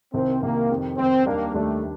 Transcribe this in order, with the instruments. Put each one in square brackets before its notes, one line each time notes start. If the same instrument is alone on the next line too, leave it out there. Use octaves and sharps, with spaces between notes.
[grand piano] C2 C3 D#3 [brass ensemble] C4
[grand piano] C2 C3 D#3 [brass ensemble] A#3
[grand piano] F2 C3 D#3
[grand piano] F2 C3 D#3 [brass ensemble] C4
[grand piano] D#2 D#3 G3 D4 G4 [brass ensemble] A#3
[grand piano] D#2 D#3 G3 D4 G4 [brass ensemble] A3